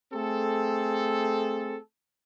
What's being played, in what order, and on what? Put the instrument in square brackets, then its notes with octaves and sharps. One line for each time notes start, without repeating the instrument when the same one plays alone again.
[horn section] A3 C4 G#4 A4